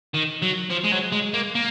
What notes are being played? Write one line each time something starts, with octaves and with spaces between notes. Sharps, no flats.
D#3
F#3
F3
G#3
F#3
G#3
A#3
A#3